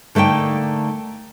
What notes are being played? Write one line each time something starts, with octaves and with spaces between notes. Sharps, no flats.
D3 A3 A#3 D#4 G5